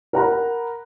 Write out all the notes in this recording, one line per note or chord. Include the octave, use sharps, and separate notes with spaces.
A#4 F#5 A#5 B5